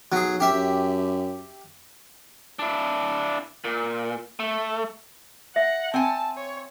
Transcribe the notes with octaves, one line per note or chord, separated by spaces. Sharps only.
B1 F#3 G#4
F#2 G4 E5
F#2
D4 E4
A#2
A3
E5 F#5
C4 F#5 G#5 A5
C#5